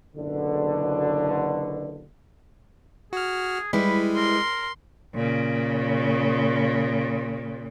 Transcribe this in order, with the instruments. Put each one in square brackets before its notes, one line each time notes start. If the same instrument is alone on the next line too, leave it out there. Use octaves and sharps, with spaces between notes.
[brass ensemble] F#1 B2 D3
[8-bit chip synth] F#4 F6 [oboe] G#4
[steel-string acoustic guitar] G3 E4 B4 [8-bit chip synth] G#3 [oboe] B5
[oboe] A#4 [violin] C6
[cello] A#2 C#3